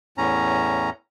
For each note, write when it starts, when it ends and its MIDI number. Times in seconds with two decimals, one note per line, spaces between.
0.18 0.90 40
0.18 0.90 45
0.18 0.90 61
0.18 0.90 82